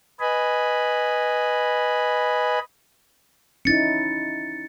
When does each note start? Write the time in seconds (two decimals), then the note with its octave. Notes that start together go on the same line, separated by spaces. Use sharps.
0.20 B4 D#5 G#5 B5
3.65 C#4 D#4 E4 A6 C#7